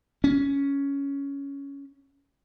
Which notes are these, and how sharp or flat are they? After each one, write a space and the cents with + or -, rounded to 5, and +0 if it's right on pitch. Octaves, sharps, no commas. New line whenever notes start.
C#4 +10